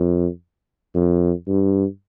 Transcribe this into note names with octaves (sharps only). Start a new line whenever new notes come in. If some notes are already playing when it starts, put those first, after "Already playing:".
Already playing: F2
F2
G2